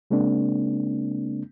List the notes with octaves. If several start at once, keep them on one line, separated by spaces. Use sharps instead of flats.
C#3 G#3 A#3 C4 D4